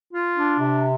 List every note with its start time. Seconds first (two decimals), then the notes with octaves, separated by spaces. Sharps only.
0.12 F4
0.36 D4
0.59 C3